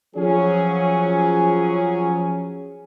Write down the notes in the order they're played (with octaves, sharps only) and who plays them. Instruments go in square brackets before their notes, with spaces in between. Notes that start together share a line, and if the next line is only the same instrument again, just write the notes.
[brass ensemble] F3 F#3 C#4 G#4